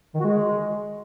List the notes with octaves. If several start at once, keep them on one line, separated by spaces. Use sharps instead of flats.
D#3
F#4
G#3